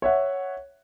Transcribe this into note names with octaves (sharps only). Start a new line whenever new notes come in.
C#5 E5 F#5